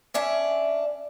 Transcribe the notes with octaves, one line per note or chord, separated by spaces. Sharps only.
C#4 D4 E5